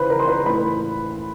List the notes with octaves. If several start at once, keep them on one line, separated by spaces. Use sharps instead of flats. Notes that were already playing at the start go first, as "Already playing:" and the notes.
Already playing: C#3 E3 B4 C5 B5
A#4 A#5
C6
B4 B5
A2 E3 A3 B4 B5